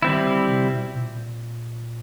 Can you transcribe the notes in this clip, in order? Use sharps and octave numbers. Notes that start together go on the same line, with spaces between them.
D#3 G3 C4 E4
D3
C3
B2
A#2